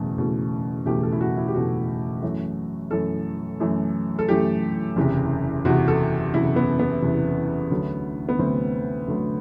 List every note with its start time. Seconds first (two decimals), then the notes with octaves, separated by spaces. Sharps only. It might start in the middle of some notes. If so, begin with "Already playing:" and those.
Already playing: F#1 E2 B2 A3
0.17 F#1 E2 B2 A3
0.86 F#1 E2 B2 A3 G4
1.03 A4
1.12 E4
1.21 F#4
1.37 E4
1.48 G4
1.54 F#1 E2 B2 A3 F#4
2.22 F#2 E3 A3
2.91 F#2 E3 A3 A4
3.60 F#2 E3 A3
4.19 A4
4.28 F#2 E3 A3 G4
4.96 F#1 E2 C3
5.65 F#1 E2 C3 F#4
5.88 A4
6.34 F#1 E2 C3 E4
6.56 B3
6.79 B3
7.02 F#1 E2 C3
7.71 D2 D3 F#3 A3
8.29 B3
8.39 D2 D3 F#3 A3 C4
9.08 D2 D3 F#3 A3